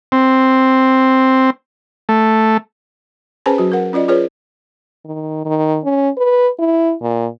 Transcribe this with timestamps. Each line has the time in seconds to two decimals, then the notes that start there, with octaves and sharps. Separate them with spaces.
0.12 C4
2.09 A3
3.46 C#4 G#4 B4 C5 G#5 A5
3.58 F#3 F#4
3.72 A#4 F#5
3.93 C#4 F4 D5 D#5
4.08 F4 G#4 B4 C#5
5.05 D#3
5.45 D#3
5.84 C#4
6.18 B4
6.59 E4
7.02 A#2